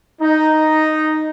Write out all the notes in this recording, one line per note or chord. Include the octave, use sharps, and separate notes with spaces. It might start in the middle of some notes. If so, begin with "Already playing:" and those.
D#4